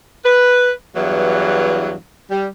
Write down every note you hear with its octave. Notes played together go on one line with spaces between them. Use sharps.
B4
E2 G2 E3 F#3
G3